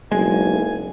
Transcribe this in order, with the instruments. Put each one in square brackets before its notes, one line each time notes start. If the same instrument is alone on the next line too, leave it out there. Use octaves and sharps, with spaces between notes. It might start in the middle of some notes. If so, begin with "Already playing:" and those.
[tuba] F#1 [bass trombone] B1 [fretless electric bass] G#3 [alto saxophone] G#5